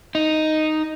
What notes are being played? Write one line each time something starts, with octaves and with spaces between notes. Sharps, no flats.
D#4